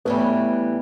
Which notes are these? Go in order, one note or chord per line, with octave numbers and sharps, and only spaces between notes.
A2 E3 G3 A3 B3